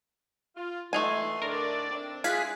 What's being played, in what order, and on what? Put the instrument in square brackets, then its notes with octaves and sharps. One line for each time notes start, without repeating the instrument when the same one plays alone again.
[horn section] F4
[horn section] E3 C6 [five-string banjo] A3 D#4 G#5
[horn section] A2 D3 D4 [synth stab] A#4 [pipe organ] D5
[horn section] C4 D4
[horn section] G#3 E4 [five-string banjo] F4 [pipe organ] G#4 [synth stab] F#6 G#6 B6